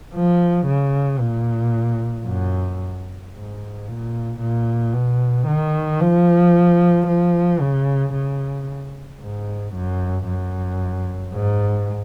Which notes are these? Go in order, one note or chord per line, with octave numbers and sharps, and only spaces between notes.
F3
C#3
A#2
F#2
G#2
A#2
A#2
B2
D#3
F3
F3
C#3
C#3
G#2
F#2
F#2
G#2